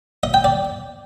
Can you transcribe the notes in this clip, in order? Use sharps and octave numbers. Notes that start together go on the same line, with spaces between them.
D#5
G5
D5